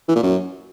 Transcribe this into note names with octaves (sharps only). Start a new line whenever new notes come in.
E3
A#2
F#2